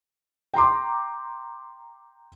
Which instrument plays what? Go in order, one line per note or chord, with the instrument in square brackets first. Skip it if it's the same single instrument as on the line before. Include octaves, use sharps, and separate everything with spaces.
[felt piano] G5 A#5 C6 D6